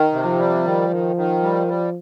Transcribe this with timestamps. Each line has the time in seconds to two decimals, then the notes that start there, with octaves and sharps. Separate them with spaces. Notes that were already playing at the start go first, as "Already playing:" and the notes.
Already playing: D#3
0.13 C3
0.25 F3
0.39 G3
0.64 D#3
0.90 D#3
1.16 D#3
1.42 G3
1.67 G3